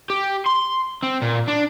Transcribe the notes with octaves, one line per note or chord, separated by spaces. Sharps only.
G4
C6
C4
A#2
D4